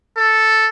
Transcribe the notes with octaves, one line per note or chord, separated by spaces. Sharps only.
A4